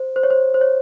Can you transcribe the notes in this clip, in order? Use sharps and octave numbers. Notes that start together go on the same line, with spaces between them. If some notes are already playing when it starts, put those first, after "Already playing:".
Already playing: C5
C5
C#5
C5
C5
C#5